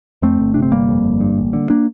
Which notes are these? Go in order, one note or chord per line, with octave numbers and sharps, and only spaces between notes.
F2 A3 C4
G1
C3 D4
C4
G1 G3 A#3
F2
G1
G2
A1
D3
A#3 D4